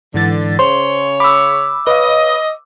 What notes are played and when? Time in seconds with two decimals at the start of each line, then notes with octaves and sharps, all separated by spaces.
0.14 G#2 D3 E3 A6
0.59 C#3 C5 C#5 C6
1.20 B5 D6 E6
1.87 B4 C#5 D#5 F5